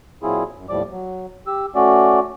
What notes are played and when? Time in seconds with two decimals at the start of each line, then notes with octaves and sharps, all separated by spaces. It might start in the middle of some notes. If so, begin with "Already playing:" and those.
0.23 A#2 F#3 C4 E4 F4 G#4
0.56 F#2
0.69 D#2 A2 F3 G3 D5 D6
0.90 F#3
1.47 G4 E6
1.75 A3 C#4 F#4 D5